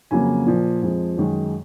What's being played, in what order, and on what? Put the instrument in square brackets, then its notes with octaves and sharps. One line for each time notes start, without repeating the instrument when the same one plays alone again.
[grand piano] F2 C#3 F#3 A#3 G#5
A#2 F3 A#3
F2 F3 G#3
F#2 D#3 G#3